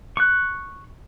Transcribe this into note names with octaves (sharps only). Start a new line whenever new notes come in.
C#6 F#6